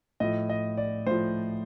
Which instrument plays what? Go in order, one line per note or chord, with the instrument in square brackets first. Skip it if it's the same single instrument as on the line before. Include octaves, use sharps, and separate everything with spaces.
[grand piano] A2 F3 D#5
D#5
D5
A2 F3 C5